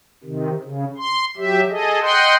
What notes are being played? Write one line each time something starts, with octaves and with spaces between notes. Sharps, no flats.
C3 D#3
C#3
C6
F#3 G4 E5
G#4 A4 D#5
D#5 F#5 G5 C6